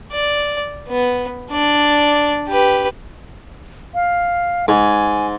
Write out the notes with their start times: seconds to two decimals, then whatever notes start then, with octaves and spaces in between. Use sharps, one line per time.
0.12 D5
0.88 B3
1.51 D4 D5
2.49 G4 B4
3.94 F5
4.68 G#2 G#5